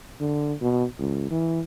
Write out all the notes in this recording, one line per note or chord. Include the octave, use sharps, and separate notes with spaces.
D3
B2
C#2
E3